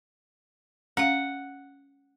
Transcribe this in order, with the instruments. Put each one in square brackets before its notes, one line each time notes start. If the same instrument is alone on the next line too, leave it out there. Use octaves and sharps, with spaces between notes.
[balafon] C#4 F5 [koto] F#5